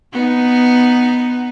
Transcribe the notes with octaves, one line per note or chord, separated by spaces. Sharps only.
B3 D#4